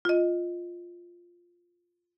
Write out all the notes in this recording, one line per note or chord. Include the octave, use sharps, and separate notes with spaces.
F4 D#5